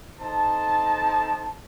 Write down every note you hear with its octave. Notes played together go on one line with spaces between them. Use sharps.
C4 D#4 A4 A5